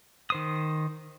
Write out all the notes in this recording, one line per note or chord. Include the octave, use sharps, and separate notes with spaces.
D#3 C5 D#6